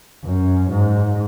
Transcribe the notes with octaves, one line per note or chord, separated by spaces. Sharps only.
F#2
G#2